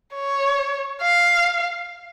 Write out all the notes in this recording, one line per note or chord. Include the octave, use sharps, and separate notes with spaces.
C#5
F5